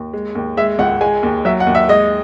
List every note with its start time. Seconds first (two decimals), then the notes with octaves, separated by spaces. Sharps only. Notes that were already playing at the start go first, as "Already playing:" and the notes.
Already playing: D#2
0.14 G#3
0.35 D#2
0.57 G#3 E5
0.79 C#2 F#5
1.01 G#3 G#5
1.23 D#2
1.45 F#3 E5
1.60 F#5
1.67 D#2
1.75 E5
1.89 G#3 D#5